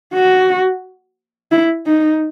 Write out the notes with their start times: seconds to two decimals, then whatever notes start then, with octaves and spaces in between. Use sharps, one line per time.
0.14 F#4
1.51 E4
1.86 D#4